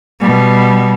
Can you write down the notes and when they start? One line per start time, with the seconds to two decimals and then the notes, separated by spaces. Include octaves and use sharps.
0.20 B2 G3